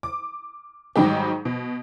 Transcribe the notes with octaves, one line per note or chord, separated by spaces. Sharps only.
D6
G#2 D#3 F#3 G3 D#4 G4
B2